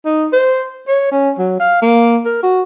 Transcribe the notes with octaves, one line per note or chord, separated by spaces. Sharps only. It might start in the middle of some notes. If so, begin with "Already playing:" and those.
D#4
C5
C#5
C#4
F#3
F5
A#3
A#4
F#4